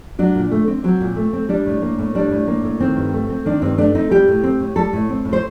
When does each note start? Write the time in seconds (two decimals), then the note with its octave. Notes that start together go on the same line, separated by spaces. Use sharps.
0.19 F#3 D4
0.35 A#2
0.51 A3
0.68 C4
0.84 F#3 C4
1.00 A#2
1.16 A3
1.33 C4
1.49 G3 D4
1.66 A2
1.82 A#3
1.99 A2
2.15 G3 D4
2.31 A2
2.47 A#3
2.64 A2
2.80 D#3 C4
2.96 G2
3.13 A3
3.30 C4
3.45 D#3 D4
3.62 G2 C4
3.78 A3 D4
3.95 C4 D#4
4.11 G3 G4
4.28 A2
4.43 C4
4.60 A2
4.76 G3 A4
4.93 A2
5.09 C4
5.25 A2
5.33 C5